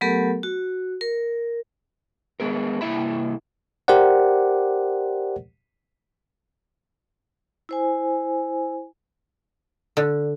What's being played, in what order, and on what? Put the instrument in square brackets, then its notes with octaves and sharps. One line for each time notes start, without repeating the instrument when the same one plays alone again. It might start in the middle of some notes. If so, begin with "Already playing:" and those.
[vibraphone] F#3 A3 B3 G4 A4 A#4
F#4
A#4
[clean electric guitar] G#3 B3 G#4 A#4
C2 A#3 E4 E5 B5
[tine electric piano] G4 A#4 C5 D5 F#5
[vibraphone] E4 C5 G#5
[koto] D3